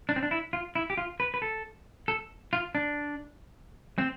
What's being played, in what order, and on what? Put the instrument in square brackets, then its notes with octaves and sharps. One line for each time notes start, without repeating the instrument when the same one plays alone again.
[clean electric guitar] D4
C4
D4
E4
F4
E4
G4
F4
B4
B4
A4
A4
F4
D4
C4